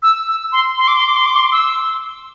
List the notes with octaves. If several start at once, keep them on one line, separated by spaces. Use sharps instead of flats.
E6
E6
C6
C6
D6
C6
D6
C6
D6
C6
E6